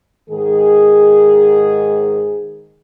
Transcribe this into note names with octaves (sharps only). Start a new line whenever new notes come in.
G#2 D#3 G#4